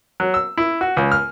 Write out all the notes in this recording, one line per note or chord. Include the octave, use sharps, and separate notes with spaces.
F#3
E6
E4
F#4
C#2
F6